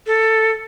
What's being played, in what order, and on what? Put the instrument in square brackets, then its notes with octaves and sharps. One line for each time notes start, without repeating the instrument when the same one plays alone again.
[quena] A4